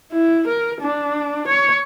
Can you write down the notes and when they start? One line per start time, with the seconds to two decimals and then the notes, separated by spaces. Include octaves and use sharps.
0.12 E4
0.48 A#4
0.82 D4
1.48 C#5